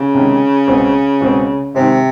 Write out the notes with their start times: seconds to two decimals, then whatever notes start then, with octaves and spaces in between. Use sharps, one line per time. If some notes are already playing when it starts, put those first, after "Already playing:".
Already playing: C#3
0.14 C3 D#3 G#3 C#4
0.68 C2 B2 G#3 C4
1.21 C2 B2 G#3 C4
1.74 G#2 C3 D#3 G#3 C4